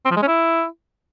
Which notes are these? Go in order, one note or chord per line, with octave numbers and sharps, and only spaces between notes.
C4
F3
G#3
C#4
E4